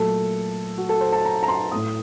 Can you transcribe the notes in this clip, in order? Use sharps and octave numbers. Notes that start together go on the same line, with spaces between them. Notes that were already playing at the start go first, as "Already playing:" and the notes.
Already playing: A#2 F#3 A3 A4
F#4
A4
C5
A5
A#5
A#5
C6
A2 A3 D#6